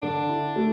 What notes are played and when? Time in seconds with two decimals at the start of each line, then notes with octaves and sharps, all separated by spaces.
0.03 D3 D4
0.29 E4
0.56 A3